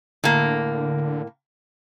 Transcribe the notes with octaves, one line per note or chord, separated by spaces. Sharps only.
A2 D3 A#3